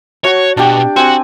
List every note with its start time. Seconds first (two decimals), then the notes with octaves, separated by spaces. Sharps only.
0.24 F#4 C#5 A5
0.57 B2 D4 G4
0.96 C4 F#4 G#5